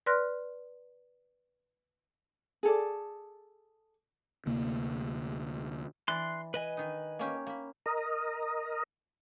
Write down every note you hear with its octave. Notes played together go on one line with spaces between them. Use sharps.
B4 D5 C6 F6 F#6 A#6
G#4 A4 D5
D2 C3 A#3
E3 D5 C6 F#6
B4 D#5 G#5
D#3 D#4
A#3 C#4 G4
A#3 B5
A#4 D#5